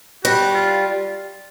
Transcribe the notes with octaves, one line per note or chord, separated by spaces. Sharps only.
G3 F#4
F4